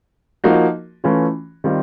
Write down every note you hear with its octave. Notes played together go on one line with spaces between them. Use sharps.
F3 A#3 D#4 F#4
E3 A3 C#4 F4
D#3 G3 C4 F4